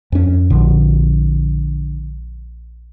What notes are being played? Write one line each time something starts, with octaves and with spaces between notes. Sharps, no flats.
F2 C#4
A#1 D3